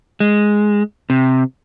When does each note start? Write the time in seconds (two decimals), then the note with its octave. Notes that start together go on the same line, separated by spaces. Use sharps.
0.20 G#3
1.10 C3